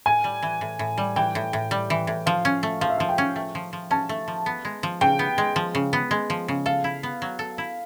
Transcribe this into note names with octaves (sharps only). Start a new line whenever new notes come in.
A2 G#5
G3
E3
A2
A2
G3
E3 G5
A2
A2
G3
E3
A2
F3 F5
C#4
A3
F3 F5
E5
F3 F5
G5
C#4
A3
F3
F3
C#4 A5
A3
F3
B3
G#3
F3
C#3 G5
B3
G#3
F3
C#3
B3
G#3
F3
C#3
A4 F5
E4
B3
F#3
A4
E4